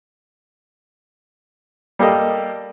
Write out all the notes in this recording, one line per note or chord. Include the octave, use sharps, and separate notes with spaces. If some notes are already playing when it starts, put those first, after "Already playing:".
G3 A#3 G4 A4 D#5